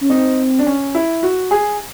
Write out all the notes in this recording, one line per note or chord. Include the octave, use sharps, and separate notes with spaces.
C#4
C4 D#4
D4
C#4
E4
F#4
G#4